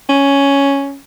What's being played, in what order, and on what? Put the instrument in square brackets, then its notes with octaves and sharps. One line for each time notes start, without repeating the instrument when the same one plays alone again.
[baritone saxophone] C#4